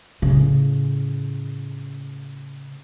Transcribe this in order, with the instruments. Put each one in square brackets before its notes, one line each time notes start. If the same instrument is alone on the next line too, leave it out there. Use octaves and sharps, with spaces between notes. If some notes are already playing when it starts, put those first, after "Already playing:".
[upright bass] A2 C#3